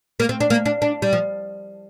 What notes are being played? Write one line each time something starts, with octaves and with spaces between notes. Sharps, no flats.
A#3
C4
D4
A#3
D4
D4
G3
F3